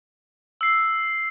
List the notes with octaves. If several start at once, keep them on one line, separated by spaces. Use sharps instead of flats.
E6 C7